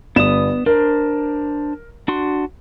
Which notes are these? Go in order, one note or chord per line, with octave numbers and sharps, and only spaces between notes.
G1 B3 D#6 E7
D4 A#4 C5
D4 F#4 C6